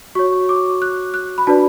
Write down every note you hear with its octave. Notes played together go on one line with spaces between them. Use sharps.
F#4 C#5 C#6
D6
F#6
F#6
B5
D4 F#4 B4 D5 A5